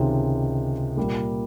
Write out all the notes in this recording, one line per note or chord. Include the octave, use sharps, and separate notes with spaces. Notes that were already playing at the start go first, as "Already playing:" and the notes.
Already playing: C#2 C3 D#3 G#3 C#4
A#2 G3 A#3